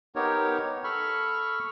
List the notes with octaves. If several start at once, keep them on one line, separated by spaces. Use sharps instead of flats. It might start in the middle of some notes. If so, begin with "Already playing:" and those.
B3 D#4 G4 A#4 C#5
A4 B5 C#6 F6